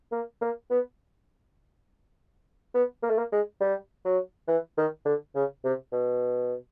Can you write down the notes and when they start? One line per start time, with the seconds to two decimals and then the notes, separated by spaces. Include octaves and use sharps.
0.12 A#3
0.42 A#3
0.71 B3
2.74 B3
3.03 A#3
3.10 A3
3.18 A#3
3.32 G#3
3.61 G3
4.05 F#3
4.48 E3
4.78 D#3
5.05 D3
5.35 C#3
5.65 C3
5.93 B2